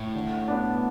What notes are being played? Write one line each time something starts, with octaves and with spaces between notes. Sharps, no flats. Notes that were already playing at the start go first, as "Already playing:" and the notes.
Already playing: A2
D3
B3 D4